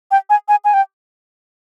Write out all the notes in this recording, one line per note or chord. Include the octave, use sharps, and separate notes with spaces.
G5
G#5
G#5
G#5
G5